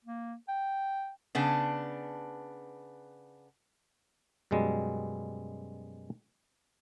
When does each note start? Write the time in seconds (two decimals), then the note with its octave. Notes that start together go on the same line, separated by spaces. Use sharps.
0.05 A#3
0.48 G5
1.35 C#3 B3 D4
4.51 F#2 B2 G3 G#3